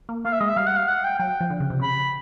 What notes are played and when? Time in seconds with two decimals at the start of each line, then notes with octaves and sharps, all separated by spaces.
0.09 A#3
0.25 A#3 F5
0.32 E5
0.40 G#3 D#5
0.48 E5
0.57 G3 F5
0.67 F#5
0.77 F5
0.88 F#5
1.04 G5
1.19 F#3 G5
1.40 F3
1.50 D3
1.60 C#3
1.70 C3
1.80 C#3 B5